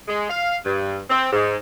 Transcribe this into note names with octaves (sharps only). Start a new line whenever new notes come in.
G#3
F5
G2
C4
G#2